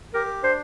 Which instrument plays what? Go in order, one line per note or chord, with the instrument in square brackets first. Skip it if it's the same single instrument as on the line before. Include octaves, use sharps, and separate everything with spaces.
[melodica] G4 [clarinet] A#4
[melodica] D4 [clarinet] C5